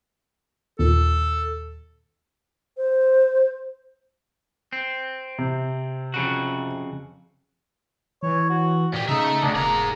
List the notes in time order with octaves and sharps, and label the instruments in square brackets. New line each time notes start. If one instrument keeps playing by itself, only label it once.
[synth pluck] D#2 A#2 [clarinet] A4
[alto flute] C5
[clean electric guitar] C4
[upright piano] C3
[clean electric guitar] F2 C#3 F#4
[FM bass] E3 [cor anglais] C#5
[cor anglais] F#4
[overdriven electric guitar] A#2 G4
[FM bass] C#3 [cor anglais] D#4 [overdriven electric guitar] A4 E5
[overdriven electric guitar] D2 [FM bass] C#3 [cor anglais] D4
[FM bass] E1 [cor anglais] A#3 [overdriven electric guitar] G#4 A#5